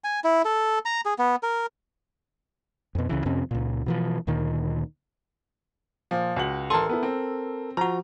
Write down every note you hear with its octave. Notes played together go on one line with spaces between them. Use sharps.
G#5
E4
A4
A#5
G#4
B3
A#4
F2 B2
C#2 C#3 E3
F2 C3 C4 C#4
C#2 A#2
B2 E3 F3
D2 A#2 D#3
A#2 F3
C#2 F#4 F#7
A1 A4 A#4 A5 C6
B3 E4
C4
F3 F#4 A#5